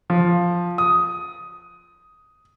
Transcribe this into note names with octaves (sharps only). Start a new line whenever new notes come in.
F3
D#6